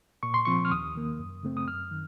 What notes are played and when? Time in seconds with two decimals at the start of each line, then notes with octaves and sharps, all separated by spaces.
0.23 A#2 C#6
0.34 C6
0.45 F3 C4 C#6
0.65 F6
0.72 D#2 D#6
0.95 D#3 A#3
1.19 F#2
1.43 C#3 A3 C4
1.57 D#6
1.68 F#2 F6
1.91 D#3